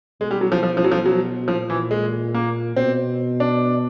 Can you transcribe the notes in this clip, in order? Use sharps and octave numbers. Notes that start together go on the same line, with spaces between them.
B2 G#3
G3
F#3
F3
F3
F3
F#3
F3
F#3
A#2 F3
E3
G#3
A#3
B2 C4
D4